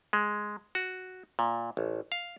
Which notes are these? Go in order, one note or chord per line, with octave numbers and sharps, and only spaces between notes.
G#3
F#4
A#2
A1
F5